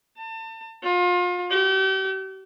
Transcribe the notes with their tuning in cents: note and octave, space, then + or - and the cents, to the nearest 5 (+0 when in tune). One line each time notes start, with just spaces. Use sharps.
A5 +35
F4 +35
G4 -40